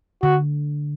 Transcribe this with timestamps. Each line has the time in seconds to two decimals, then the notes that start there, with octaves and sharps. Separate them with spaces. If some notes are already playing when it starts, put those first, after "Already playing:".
0.22 D3 F#4